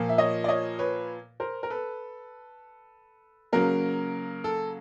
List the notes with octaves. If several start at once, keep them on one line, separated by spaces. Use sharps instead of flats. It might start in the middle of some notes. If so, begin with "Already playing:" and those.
Already playing: A#2 F3 A#3
E5
C#5 D#5
D5
C#5 D#5
B4 C#5
A#4 C5
A#4
A4 B4
C#3 F#3 A#3 A#4
A4